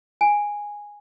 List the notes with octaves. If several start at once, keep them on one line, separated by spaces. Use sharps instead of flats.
G#5